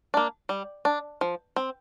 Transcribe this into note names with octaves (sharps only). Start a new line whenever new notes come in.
A#3 D4
G3
D4
F3
C4